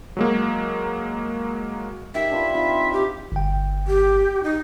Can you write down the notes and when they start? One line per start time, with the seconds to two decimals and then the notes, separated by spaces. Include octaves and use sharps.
0.17 F#3 G#3 A#3
2.15 D#3 G4 E5
2.31 D4 F4 B4
2.54 C4 D#4 F4
2.93 G4
3.32 G1 G5
3.88 G4
4.44 D#4